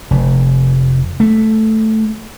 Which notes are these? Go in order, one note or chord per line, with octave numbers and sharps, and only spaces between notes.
F1
A3